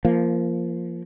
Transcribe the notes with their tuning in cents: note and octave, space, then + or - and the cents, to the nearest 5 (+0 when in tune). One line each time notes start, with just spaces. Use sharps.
F3 -20 A#3 +0